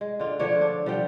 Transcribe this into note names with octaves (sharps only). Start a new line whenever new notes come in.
G#3
D3 F4
D3 F3 D4 C#5
D4
F3 G3 F#5 G5